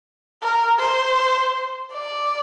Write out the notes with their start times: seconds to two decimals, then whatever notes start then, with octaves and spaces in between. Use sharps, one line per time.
0.42 A#4
0.79 C5
1.92 D5